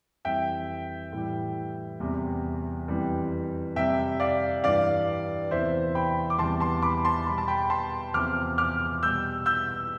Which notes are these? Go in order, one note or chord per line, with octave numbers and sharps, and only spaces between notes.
F2 E3 G3 E5 G5
A2 E3 G3
E2 C3 G3
F2 E3 G3
F2 C3 G3 E5 G5
D5 F5
G2 E3 G3 D5 F5
E2 C3 E3 C5 E5
G5 B5
D6
E2 C3 E3 G3 A5 C6
A5 C6
B5 D6
A5 C6
B2 G3 B5
A5
G5 B5
A5 C6
E2 C3 F3 D6 F6
D6 F6
B2 G3 E6 G6
E6 G6